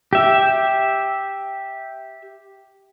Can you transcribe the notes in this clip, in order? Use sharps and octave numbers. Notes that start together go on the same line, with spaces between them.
G4 E5